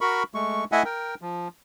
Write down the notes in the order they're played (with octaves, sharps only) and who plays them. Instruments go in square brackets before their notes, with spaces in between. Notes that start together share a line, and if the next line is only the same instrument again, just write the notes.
[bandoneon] F#4 A#4 B5 C#6
G#3 A3 C#6
A3 E4 D#5 E5 F#5 G#5
A#4 G5
F3